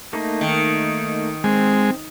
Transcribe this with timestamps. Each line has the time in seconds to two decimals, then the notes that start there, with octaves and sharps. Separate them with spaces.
0.13 A3 A#3 D#4
0.41 D#3
1.44 G#3 C4